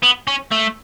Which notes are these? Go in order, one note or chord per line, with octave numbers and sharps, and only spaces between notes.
B3
C#4
A3